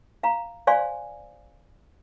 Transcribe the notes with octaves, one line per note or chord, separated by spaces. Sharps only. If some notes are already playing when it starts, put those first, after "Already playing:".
F5 A#5
C5 D5 F5 G#5 C6